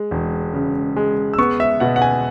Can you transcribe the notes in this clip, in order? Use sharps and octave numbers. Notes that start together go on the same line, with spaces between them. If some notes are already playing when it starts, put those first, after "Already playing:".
Already playing: G#3
E1
C#3
G#3
E6
B3 C#6
E5
B2 F#5
F#5
G#5